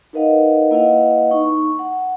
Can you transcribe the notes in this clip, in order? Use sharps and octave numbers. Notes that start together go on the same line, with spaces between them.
D#4 A#4 B4 D#5 F5 F#5
A#3 E4 B4 D#5 F5 F#5
D#4 C#6
F#5